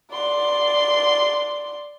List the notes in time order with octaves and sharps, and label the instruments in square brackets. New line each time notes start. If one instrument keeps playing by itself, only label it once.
[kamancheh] D5 C6